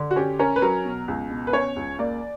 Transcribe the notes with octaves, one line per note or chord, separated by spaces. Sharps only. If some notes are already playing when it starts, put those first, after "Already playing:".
Already playing: D3
F#4
C#4 G4
C#4 A#4
B4
F#3 A#4
B2
C#2
B2
B4
C#4 C#5
C#2
A#3 D5